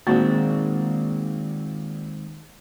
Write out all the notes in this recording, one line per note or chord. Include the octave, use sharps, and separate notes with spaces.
A#2 D#3 G#3 C4 F#4 A6